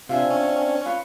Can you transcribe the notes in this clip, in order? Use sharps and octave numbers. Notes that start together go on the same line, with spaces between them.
C3 C4 D4 F4 E5 G#5
C#4
F4 B4 C#5